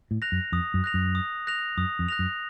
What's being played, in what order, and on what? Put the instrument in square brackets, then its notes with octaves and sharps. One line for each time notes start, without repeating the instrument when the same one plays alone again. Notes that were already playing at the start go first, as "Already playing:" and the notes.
[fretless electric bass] A2
[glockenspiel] F#6 A#6 F7
[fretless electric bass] F#2
[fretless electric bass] F2 [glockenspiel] D#6
[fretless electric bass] F#2
[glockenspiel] F#6 A#6 F7
[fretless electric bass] F#2
[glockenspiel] D#6
F#6 A#6 F7
[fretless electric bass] F#2 [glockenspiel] D#6
[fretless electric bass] F2
[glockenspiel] F#6 A#6 F7
[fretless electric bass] F#2